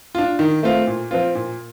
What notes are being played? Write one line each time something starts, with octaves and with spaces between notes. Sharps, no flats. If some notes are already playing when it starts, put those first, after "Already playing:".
D4 F4
D#3
A3 C4 F4
A#2
F3 C4 F4
A#2